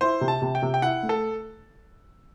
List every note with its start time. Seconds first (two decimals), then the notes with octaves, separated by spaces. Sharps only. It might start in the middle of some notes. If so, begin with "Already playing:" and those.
0.01 E4 C5
0.21 C3
0.28 A5
0.42 C3
0.55 G5
0.62 C3
0.74 G5
0.82 E4 F#5
1.03 A3
1.09 A4